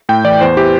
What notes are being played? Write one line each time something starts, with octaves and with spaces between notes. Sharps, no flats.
A2 G5
E3 D5
E2 C5
E3 G4